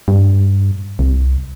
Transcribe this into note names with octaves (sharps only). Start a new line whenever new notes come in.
G2
C2